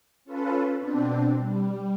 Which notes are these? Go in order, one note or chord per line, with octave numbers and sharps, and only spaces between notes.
C#4 F4 A4 B4
B2 C4 D4
G3